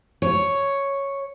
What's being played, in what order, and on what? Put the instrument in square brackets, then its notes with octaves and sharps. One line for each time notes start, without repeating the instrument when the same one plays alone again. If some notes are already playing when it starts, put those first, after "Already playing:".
[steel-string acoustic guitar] C#5